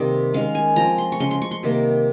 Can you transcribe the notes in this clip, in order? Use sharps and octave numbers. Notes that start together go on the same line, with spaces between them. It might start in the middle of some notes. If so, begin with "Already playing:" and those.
Already playing: C3 D#3 G3 A#3 C4 D#5
D#3 G#3 C#4 F5
G#5
F3 C4 A#5
C6
C#6
C#3 G#3 C#4 C6
C6
C#6
C6
C3 D#3 G3 A#3